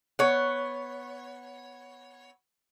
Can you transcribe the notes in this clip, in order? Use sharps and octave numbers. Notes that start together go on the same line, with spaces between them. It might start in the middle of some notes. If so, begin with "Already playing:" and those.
B3 C#5